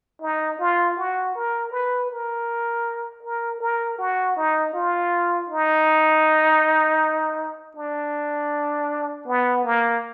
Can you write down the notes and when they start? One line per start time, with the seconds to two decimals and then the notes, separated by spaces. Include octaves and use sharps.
0.22 D#4
0.59 F4
0.97 F#4
1.35 A#4
1.72 B4
2.10 A#4
3.23 A#4
3.60 A#4
3.98 F#4
4.37 D#4
4.74 F4
5.50 D#4
7.76 D4
9.27 B3
9.65 A#3